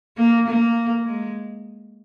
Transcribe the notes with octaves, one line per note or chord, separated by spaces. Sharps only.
A#3
A#3
G#3